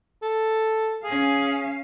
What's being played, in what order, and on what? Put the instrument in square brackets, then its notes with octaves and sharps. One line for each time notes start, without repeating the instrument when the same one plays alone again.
[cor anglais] A4
[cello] C#4 F5 [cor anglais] G#4